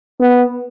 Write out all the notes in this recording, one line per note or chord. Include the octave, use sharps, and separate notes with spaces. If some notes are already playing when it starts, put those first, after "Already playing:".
B3